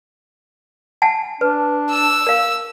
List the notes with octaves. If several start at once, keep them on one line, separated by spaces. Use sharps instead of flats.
F#5 G#5 A5
D4 B4
E6
A#4 F5